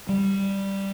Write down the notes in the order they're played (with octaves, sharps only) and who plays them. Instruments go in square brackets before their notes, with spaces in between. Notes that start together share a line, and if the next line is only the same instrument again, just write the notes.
[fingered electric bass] G3